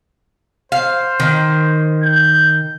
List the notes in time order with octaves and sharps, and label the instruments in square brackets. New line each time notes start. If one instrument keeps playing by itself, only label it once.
[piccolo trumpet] C5 [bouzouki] F5
[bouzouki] D#3
[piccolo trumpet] G6